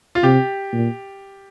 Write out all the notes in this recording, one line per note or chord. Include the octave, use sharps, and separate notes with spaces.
F4
C3 G4
A#2